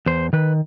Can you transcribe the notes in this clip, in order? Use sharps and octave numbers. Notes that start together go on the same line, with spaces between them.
E2 C5
D#3 B4